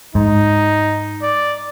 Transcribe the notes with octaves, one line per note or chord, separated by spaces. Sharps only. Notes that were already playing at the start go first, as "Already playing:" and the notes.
G#2 D#4
D5